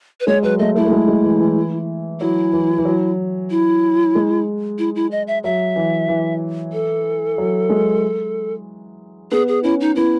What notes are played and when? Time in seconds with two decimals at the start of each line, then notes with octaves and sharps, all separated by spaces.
0.20 B4
0.27 G#3 C#5
0.43 F#3 B4
0.59 A3 D#5
0.75 A3 E4
0.85 A3
0.91 G#3
1.08 G#3
1.24 E3
1.40 E3
2.20 F#3 E4
2.53 E3
2.78 E3
2.85 F#3
3.50 E4
4.15 G#3
4.79 E4
4.96 E4
5.11 D#5
5.27 E5
5.44 F#3 E5
5.76 E3
6.08 E3
6.73 A4
7.38 F#3
7.69 G#3
9.32 B3 G#4
9.48 G#4
9.63 C#4 E4
9.81 D#4
9.96 B3 E4